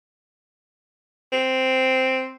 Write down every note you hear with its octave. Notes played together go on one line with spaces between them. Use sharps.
C4